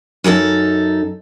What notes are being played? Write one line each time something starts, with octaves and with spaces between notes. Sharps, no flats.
F#2 D#4 G#4 A4